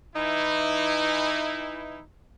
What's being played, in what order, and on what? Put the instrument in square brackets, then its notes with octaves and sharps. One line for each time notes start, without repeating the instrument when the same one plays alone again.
[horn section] E3 D#4 E4